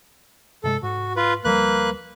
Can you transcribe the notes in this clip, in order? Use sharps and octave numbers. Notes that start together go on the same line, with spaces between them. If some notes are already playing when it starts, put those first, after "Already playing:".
G2 C3 G#3 A4
G#2 F#4
F4 B4
D2 F3 G3 A#3 B4 F#6